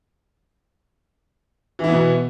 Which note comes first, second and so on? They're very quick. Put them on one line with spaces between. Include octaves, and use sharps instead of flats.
E3 E4 B3 B2